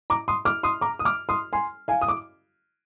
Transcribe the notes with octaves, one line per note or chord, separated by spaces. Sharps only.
A#5 D6
C6 D#6
D6 F6
C6 D#6
A#5 D6
D#6
D6 F6
C6 D#6
G#5 C6
F5 G#5
D#6
D6